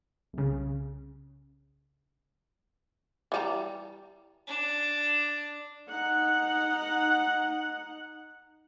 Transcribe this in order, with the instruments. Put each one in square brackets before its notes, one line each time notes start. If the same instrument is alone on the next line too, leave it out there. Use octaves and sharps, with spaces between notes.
[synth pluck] C2 C#3
[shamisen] E3 G3 A#5
[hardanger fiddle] D4
[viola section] D#4 F#5